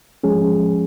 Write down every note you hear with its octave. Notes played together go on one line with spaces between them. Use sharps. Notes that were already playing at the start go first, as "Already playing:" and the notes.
F3 G#3 C#4 G#4